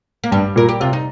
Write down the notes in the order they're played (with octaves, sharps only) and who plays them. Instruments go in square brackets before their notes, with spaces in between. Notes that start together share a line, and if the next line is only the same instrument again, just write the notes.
[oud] A#3
[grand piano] G2 [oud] G3
[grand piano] A#2 [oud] A#4
[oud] G4
[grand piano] C3 [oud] F4
[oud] D#4